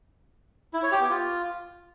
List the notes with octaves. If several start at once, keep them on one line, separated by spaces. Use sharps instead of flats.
E4
C#5
G4
B3
F4